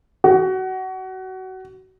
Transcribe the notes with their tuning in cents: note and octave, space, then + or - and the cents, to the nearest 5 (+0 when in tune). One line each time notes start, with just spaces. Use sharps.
F#4 +25